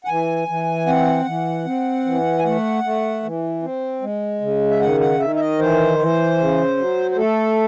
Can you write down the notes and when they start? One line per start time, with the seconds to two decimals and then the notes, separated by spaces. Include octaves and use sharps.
0.04 F#5
0.08 E3 G#5
0.48 E3
0.87 C4 F#5
1.26 E3
1.66 C4
2.05 E3
2.39 G#5
2.44 A3 F#5
2.84 A3
3.23 E3
3.62 C4
4.02 G#3
4.41 C#3
4.70 E5
4.81 D#3 F#5
5.00 F#5
5.20 D#3 E5
5.36 E5
5.40 D#5
5.59 E3 C5
5.99 E3
6.38 C#3
6.77 F#3
7.11 C5
7.16 A3 A4